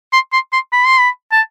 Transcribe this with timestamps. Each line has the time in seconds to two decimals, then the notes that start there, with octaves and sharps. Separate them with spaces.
0.13 C6
0.33 C6
0.53 C6
0.73 B5
0.86 C6
1.00 B5
1.32 A5